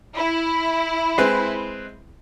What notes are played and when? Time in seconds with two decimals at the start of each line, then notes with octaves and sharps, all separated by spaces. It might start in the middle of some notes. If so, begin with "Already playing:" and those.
0.16 E4
1.18 G#3 C4 B4